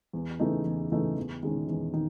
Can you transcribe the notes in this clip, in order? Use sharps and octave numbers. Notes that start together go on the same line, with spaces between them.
E2
C#3 E3 A3 D#4
E2
C#3 E3 A3 D#4
E2
D#3 G#3 C#4
E2
D#3